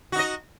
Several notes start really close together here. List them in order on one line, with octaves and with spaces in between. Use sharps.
F#4 D#4 D#5